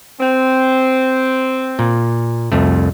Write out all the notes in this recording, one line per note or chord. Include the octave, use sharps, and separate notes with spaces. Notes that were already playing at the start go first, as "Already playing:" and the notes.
C4
A#2
C2 F2 A3